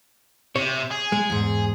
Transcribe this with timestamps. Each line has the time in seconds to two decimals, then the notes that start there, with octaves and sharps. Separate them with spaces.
0.56 C3 C#5
0.91 G#4
1.12 G#3
1.30 E2 G#2